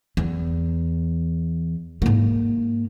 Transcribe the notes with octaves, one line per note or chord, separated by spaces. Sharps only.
E2
G#2 A#3